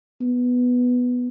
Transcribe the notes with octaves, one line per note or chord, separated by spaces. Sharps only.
B3